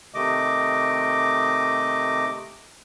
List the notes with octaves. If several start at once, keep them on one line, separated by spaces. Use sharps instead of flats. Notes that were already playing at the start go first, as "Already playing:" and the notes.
C3 D#3 A3 D#5 D6